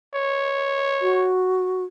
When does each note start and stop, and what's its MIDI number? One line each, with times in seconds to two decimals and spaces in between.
0.15 1.32 73
1.02 1.84 66